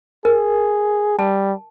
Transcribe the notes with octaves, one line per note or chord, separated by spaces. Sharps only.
G#4 A#4
G3 A5